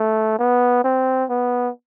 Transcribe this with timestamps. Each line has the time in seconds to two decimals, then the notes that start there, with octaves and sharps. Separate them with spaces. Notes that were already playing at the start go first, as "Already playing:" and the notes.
Already playing: A3
0.39 B3
0.84 C4
1.29 B3